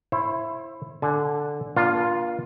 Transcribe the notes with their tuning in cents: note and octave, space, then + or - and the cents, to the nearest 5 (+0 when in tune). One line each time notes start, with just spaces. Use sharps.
E4 +10 C5 +35
D3 +0 G#5 +45
A#3 +40 D4 -5 F4 +0